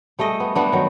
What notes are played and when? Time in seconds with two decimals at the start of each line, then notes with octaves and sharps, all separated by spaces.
0.19 G3 A3 G#4 D#5
0.40 B3
0.55 G3 B3 D4
0.72 D#3 F#3